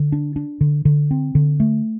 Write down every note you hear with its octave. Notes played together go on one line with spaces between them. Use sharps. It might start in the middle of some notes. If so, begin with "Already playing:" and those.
Already playing: D3
D4
D4
D3
D3
C4
D3
A3